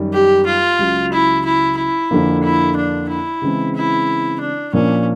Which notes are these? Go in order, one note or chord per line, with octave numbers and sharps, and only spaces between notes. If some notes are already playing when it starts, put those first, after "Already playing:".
Already playing: F#2 D#3 G3
G4
F4
C#2 C#3 F#3
E4
E4
E4
F2 D3 F3 A#3
E4
D4
E4
C#3 E3 G#3 C4
E4
D4
A#2 F3 A#3 C#4 D4